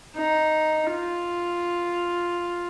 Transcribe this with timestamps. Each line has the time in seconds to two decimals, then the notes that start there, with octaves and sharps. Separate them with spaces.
0.16 D#4
0.91 F4